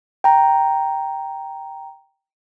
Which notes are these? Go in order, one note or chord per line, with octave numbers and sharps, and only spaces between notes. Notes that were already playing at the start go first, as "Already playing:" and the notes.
G5 A#5